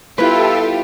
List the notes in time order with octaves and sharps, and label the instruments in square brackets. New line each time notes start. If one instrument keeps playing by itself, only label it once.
[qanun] G3 B3 E4 [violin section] F4 G4 [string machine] A4 E5 [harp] B4